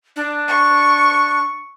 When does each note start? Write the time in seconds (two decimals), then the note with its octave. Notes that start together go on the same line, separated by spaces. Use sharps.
0.16 D4
0.48 C#6